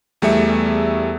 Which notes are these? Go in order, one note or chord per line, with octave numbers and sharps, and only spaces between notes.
E2 G3 A3 G#4 E5 C#7